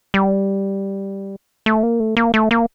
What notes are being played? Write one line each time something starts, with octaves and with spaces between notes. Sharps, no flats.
G3
A3
A#3
A3
A#3
A3
A#3